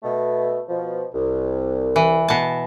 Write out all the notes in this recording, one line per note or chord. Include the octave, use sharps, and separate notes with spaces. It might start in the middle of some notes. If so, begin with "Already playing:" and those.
B2 A3
B2 F3
C2
E3
B2 A5